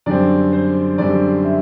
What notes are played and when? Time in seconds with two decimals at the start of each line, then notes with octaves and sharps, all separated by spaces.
0.06 F#2 D3 G3 C4 D5
0.53 C5
0.98 F#2 D3 G3 C4 D5
1.45 E5